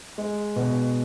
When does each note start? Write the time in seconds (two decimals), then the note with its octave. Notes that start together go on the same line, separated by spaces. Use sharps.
0.18 G#3
0.56 B2